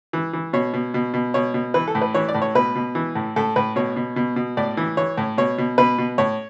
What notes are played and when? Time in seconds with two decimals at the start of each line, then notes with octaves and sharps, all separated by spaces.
0.13 E3
0.33 E3
0.53 B2 C#5
0.74 B2
0.94 B2
1.14 B2
1.34 B2 C#5
1.54 B2
1.74 E3 B4
1.88 A4
1.95 A2
2.01 B4
2.14 E3 C#5
2.28 D5
2.34 A2
2.42 C#5
2.55 B2 B4
2.75 B2
2.95 E3
3.15 A2
3.36 A2 A4
3.56 A2 B4
3.76 B2 C#5
3.96 B2
4.16 B2
4.36 B2
4.57 A2 D5
4.77 E3
4.97 E3 C#5
5.17 A2
5.38 B2 C#5
5.58 B2
5.78 B2 B4
5.98 B2
6.18 A2 C#5